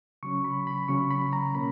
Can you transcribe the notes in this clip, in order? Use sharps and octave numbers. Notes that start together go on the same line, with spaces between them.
C#3 F#3 C#4 C#6
B5
B5
C#3 F#3 C#4 C#6
B5
A#5
B2 A#3 C#4 B5